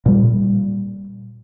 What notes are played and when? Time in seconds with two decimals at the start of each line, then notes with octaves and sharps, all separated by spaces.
0.06 A#2 G3